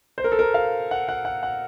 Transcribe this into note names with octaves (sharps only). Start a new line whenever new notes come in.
C5
A#4
A4
A#4
F5
F#5
F#5
F#5
F#5